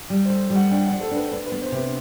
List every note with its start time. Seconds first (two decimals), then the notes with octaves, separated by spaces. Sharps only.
0.10 G3
0.25 A4 C5
0.50 G3
0.55 F#5
0.71 D4 G5
0.86 F#5
0.91 D4
1.01 A4
1.11 D4 B4
1.31 D4 B4
1.46 B4
1.52 B3
1.62 C5
1.72 C3 B4